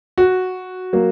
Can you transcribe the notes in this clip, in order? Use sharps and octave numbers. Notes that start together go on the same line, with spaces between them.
F#4
F#3 A#3